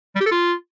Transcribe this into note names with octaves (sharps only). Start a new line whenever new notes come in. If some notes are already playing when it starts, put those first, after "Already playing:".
G3
G4
A4
F4